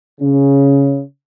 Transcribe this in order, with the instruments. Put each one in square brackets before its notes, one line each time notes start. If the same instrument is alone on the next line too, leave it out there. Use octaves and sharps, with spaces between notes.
[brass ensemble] C#3 C#4